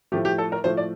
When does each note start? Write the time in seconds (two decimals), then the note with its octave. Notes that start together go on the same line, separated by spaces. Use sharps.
0.12 A2 F3 A3 G4
0.25 G4
0.38 A4
0.52 A#4
0.64 A2 F3 A3 C5
0.77 D5